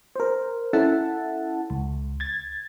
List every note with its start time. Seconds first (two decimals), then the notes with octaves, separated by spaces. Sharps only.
0.16 A#4 C5
0.73 C#4 E4 A4 E5 F#5 A5
1.70 C#2
2.20 G#6 A6